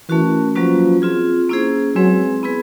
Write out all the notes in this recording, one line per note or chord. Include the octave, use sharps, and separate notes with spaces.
E3 A3 C#4 F#4 A#4
F3 F#3 A#3 C#4 F#4 B4
C4 F4 G#4
A#3 C#4 E4 G#4 C5
F#3 G#3 C4 E4 G#4 B4
B3 E4 G#4 B4